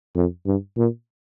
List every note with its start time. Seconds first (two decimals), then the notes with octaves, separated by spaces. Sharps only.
0.15 F2
0.46 G2
0.77 A#2